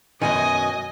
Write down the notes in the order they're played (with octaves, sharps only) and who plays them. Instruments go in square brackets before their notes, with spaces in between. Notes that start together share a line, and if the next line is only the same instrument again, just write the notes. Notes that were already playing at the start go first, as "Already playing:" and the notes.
[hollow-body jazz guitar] F#2 B2 D#3 [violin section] D#5 [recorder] G#5